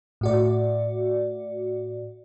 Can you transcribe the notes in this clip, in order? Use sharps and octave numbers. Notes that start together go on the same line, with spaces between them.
A2 F#4 D5